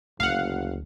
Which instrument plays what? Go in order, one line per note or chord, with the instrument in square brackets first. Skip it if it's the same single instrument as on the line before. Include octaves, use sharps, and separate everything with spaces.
[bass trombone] F#1 [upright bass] D2 [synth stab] F5 F#5